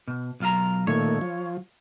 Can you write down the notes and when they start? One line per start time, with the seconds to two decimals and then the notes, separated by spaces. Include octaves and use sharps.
0.08 B2
0.40 B1 F4 A#5
0.87 A#2 D#3 A3 C#5
1.21 F3